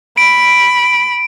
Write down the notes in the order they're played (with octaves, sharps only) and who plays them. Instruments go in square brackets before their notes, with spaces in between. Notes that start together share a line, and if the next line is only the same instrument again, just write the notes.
[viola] B5 [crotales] D7